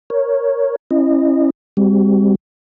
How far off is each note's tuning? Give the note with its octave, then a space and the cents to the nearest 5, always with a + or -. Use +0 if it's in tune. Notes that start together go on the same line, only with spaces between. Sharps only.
A#4 +0 C#5 +0
C#4 -25 E4 +5 D#5 -25
G3 +40 C4 +0 F#4 +40